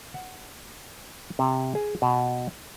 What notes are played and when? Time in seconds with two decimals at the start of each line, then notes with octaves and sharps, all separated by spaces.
0.14 F#5
1.39 C3
1.75 G#4
2.02 B2